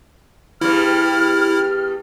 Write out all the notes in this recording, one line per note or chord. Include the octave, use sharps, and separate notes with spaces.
E2 G2 G3 E4 F6